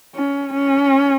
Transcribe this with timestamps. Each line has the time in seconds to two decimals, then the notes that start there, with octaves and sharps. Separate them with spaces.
0.15 C#4
0.53 C#4